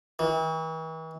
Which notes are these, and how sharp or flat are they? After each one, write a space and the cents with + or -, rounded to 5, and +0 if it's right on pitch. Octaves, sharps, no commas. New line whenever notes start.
E3 -45